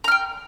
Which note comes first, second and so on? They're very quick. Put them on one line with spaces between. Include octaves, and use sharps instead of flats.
A#5 F6 G5